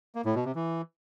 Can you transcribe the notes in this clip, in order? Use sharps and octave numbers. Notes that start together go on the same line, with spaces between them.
A#3
A2
B2
C3
E3